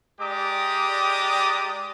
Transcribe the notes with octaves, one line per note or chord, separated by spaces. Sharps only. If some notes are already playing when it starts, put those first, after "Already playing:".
G#3 G4 D5 A#5 D6 D#6